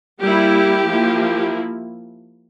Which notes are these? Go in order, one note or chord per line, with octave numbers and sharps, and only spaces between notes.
G3 A#3 E4 G4
F3 A#3 E4